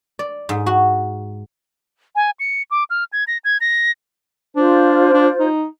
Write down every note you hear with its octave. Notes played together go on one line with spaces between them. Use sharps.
D5
G#2
F#4
G#5
C#7
D6
F6
G#6
A#6
G#6
A#6
D4 F4 C5
D4
D#4